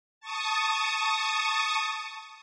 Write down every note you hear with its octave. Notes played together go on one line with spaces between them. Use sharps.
A5 C#6 D#6